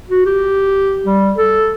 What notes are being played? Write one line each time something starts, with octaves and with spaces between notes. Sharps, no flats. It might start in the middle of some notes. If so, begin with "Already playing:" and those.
F#4
G4
G3
A4